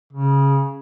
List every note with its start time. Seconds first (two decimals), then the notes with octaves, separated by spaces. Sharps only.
0.13 C#3